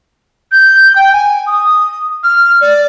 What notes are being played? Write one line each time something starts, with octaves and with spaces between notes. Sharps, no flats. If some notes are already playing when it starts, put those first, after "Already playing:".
G6
G5
G#5
D#6
F6
D5